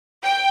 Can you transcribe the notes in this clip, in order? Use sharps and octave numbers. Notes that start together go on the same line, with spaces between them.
G5